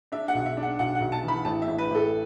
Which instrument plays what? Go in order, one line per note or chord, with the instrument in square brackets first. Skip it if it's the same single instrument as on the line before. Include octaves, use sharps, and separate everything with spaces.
[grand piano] D4 [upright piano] E5
[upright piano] F#5
[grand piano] B1
[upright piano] E5
[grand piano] D4
[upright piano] F#5
[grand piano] B1 [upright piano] F#5
[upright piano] F#5
[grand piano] B1
[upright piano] A5
[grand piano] E3
[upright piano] B5
[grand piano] A1 [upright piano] A5
[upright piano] E5
[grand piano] A1
[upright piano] B4
[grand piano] A1 [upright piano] A4